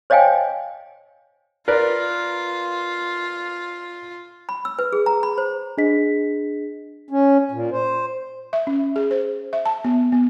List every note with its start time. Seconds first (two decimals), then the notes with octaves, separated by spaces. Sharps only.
0.10 C5 C#5 D#5 F5 G5 G#5
1.68 F4 A#4 B4 D5
4.49 B5
4.65 E6
4.79 B4
4.93 G#4
5.06 A#5
5.23 B5
5.38 C5
5.78 D4 G#4 D#5 B6
7.10 C#4
7.51 A#2
7.71 C5
8.53 E5
8.67 C#4
8.96 G#4
9.11 C5
9.53 E5
9.65 A5
9.84 B3
10.12 B3